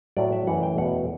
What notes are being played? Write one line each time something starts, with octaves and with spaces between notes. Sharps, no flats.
A2 F#3 A3 D5
E5
F#2 E3 A3 F#5
G5
E2 B2 A3 F#5